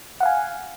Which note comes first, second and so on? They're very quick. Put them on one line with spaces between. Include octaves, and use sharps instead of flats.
F#5 F5 G#5